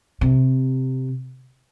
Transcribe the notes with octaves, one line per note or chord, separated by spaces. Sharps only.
C3